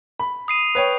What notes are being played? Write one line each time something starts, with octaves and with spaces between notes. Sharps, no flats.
B5
D#6 C7 D#7
B4 C#5 G5